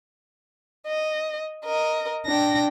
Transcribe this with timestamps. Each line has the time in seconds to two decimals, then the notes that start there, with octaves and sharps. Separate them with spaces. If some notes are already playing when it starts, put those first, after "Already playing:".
0.87 D#5
1.65 A#4 D#5
2.27 D4 G5 A#6